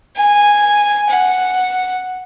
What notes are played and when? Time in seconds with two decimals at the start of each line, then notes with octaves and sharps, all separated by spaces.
0.16 G#5
1.10 F#5